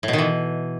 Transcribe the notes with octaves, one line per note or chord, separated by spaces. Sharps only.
A2
B2
D#3
E3